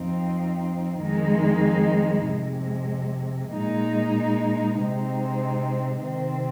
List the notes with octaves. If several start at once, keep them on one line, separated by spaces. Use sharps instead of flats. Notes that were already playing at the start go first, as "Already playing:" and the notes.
Already playing: F2 F3 C4 D#4
F2 D#3 G#3 D#4
F2 C3 G#3
A#2 G#3 D#4
C3 G#3 C4 D#4
C3 D#3 C4